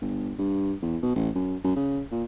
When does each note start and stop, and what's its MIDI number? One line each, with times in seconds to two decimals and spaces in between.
0.01 0.33 31
0.38 0.73 43
0.82 0.97 40
1.03 1.13 47
1.15 1.29 33
1.35 1.55 42
1.64 1.72 42
1.76 2.01 49
2.11 2.23 46